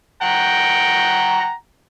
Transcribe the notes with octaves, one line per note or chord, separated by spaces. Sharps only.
F#5 G5 A#5